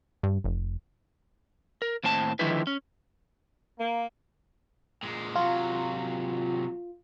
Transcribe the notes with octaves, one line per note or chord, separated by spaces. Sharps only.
G2
F1
A#4
D#2 A2 C4 A5
D3 D#3 F3 G#3 E4 B4
C#4
A#3
A#2 G#3
C3 F#3 F4